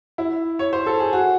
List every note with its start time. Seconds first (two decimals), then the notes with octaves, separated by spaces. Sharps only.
0.18 E4
0.59 C#5
0.73 C5
0.86 A4
1.00 G#4
1.13 F#4